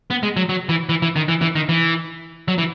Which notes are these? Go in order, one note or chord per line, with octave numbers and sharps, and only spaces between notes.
B3
G#3
F#3
F#3
E3
E3
E3
D#3
E3
E3
D#3
E3
F#3
E3